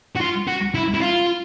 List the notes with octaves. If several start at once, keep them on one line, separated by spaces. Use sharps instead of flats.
F#4
F4
F#4
E4
E4
F4